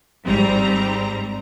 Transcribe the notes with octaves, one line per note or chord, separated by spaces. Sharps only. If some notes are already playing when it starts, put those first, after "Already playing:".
G#1 G#2 G3 C4 A#5